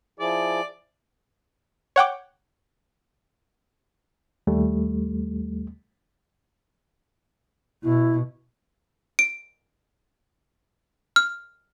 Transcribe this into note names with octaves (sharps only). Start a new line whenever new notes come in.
F3 E4 G#4 D5
C#5 F#5 G5 D6
D#2 G3 A3
B2 E4
D7
F6